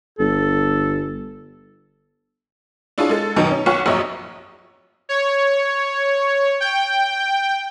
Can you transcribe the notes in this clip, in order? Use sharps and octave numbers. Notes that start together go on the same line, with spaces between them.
G1 A4
D4 E4 F4 G#4 C#5
G#3 A4
F#2 B2 D#3 F#3 D#4
C#4
B1 C#5 F#5 C#6
A#1 F#2 F#3 C#5 D#5 E5
C#5
G5